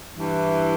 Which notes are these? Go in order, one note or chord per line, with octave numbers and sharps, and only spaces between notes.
G2 E3